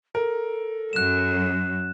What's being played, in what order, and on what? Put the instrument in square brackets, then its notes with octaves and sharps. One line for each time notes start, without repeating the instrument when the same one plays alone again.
[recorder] A4 [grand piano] A#4
[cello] F#2 F#3 [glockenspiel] F#6 E7